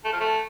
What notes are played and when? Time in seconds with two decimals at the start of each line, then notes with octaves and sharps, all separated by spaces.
0.05 A3
0.12 F3
0.20 A3